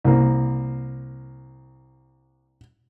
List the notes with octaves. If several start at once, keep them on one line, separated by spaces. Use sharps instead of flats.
C2 A#3